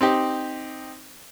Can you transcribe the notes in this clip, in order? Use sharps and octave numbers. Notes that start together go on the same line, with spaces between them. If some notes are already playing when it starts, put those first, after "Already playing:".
C4 D#4 G4